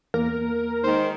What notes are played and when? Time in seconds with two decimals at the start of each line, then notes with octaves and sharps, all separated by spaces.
0.14 E2 A#3 A#4
0.84 D#3 G#3 D#4 C5